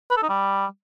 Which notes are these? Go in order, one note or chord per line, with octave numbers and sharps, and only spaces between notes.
B4
A4
D#4
G3